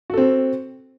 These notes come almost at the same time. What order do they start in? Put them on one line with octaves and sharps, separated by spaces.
F#4 A4 C4